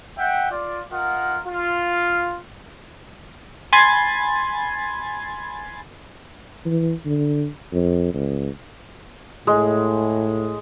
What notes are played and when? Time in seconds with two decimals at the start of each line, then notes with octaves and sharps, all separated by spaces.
0.17 E5 F#5 G5
0.50 F4 D5
0.92 F4 A#4 D#5 F#5
1.46 F4
3.73 G#5 B5 C6 G#6 A6
6.65 E3
7.05 D3
7.72 F2
8.14 C#2
9.47 A2 G#3